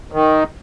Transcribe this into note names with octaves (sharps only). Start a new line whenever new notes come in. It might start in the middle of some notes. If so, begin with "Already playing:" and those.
D#3